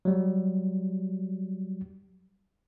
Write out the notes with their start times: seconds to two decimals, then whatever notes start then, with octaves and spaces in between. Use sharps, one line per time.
0.05 F#3 G3